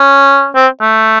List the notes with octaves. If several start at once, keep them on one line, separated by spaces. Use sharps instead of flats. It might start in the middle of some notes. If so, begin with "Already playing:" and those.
Already playing: C#4
C4
A3